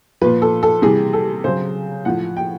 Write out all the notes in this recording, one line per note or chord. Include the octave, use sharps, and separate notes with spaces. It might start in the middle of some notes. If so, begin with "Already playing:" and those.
A#2 F3 B4
A4
A4
C3 E3 G3 G#4
A4
C#3 F#3 C5
A2 F3 F#5
G5